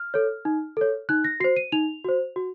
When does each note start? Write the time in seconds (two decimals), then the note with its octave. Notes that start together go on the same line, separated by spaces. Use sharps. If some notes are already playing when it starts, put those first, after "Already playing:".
Already playing: F6
0.14 A4 C#5
0.45 D#4
0.77 A4 C#5
1.09 D#4 F#6
1.24 A#6
1.40 F#4 C5 C7
1.57 D#7
1.72 D#4 F7
2.04 F#4 C5
2.36 F#4